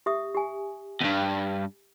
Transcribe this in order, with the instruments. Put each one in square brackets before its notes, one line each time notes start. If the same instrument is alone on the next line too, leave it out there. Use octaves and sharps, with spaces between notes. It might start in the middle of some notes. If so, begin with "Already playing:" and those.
[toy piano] G4 E5 D#6
G4 G#5
[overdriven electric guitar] E2 G2